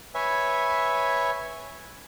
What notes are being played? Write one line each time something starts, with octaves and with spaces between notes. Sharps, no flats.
B4 C#5 E5 G#5